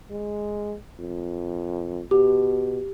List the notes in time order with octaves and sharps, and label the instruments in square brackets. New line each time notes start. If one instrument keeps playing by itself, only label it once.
[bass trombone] G#3
F2
[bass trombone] B2 [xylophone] G4